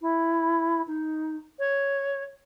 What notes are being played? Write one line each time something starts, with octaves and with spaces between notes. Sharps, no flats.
E4
D#4
C#5